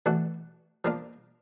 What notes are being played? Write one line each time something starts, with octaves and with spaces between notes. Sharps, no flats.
E3 A3 D4 F#4
F3 A#3 D4 F4